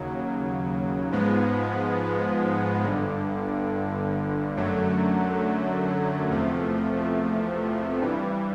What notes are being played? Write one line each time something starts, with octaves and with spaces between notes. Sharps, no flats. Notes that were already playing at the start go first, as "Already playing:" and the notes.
Already playing: D#2 C#3 F#3
G#2 F3 G#3 B3
G1 G2 D3
F#2 D3 F#3 A3
E2 C3 F3 A3
G2 E3 G3